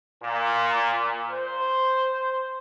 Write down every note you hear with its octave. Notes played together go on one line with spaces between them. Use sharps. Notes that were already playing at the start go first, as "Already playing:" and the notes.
A#2
C5